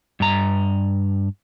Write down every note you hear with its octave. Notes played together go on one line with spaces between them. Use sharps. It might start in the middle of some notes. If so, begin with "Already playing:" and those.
G2 A#5